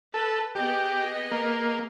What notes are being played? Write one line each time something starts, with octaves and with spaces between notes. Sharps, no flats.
A4 B4
B3 G4 G#4 D#5
A#3